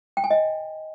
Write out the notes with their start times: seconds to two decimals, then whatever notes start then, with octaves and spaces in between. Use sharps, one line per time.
0.17 G5
0.24 G#5
0.31 D#5